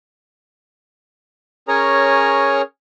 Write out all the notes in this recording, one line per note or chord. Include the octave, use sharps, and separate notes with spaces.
C#4 G#4 A#4 C#5 A#5